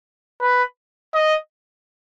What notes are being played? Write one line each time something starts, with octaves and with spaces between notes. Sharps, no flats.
B4
D#5